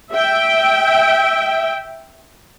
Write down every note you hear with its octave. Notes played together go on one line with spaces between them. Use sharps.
E5 G5